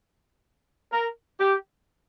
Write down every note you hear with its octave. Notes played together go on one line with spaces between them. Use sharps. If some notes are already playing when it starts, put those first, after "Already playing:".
A#4
G4